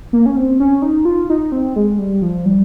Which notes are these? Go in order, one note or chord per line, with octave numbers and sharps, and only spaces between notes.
A#3
C#4
C4
C#4
D#4
F4
D#4
C4
G#3
G3
F3
G3